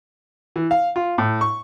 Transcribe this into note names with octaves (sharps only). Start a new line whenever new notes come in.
E3
F5
F4
A2
C#6